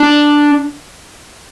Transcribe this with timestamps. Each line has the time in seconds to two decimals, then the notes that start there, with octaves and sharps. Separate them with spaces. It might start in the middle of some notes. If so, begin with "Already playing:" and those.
Already playing: D4